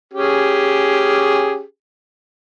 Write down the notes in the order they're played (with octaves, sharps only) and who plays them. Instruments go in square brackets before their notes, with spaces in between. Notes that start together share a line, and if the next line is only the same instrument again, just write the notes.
[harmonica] C#4 G4 G#4